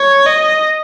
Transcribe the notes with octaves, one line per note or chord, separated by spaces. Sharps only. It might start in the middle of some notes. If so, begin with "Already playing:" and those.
Already playing: C#5
D#5